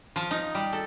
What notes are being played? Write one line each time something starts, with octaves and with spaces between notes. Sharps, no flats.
F3
D#4
G3
A4